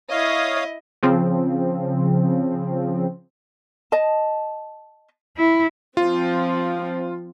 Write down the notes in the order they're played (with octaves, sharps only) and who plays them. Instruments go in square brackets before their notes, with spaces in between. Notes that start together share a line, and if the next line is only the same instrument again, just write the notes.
[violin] E4 D#5 [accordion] C#5 F5 D#6
[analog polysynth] C#3 F3 C4
[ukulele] D#5 A5
[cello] E4
[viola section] F3 C4 [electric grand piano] F4